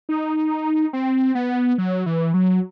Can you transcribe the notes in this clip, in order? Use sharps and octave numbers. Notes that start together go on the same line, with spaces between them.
D#4
C4
B3
F#3
E3
F#3